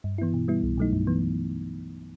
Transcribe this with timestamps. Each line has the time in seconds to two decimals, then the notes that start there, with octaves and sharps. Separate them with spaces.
0.04 G2
0.18 E3 B3 E4
0.34 B2
0.48 G3 B3 E4
0.63 C2
0.78 B2 F#3 A3 D#4
0.93 G2
1.07 E3 B3